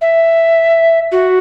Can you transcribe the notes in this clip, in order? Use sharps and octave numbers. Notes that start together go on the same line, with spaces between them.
E5
F#4